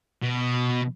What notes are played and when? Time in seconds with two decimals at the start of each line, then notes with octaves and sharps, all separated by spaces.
0.23 B2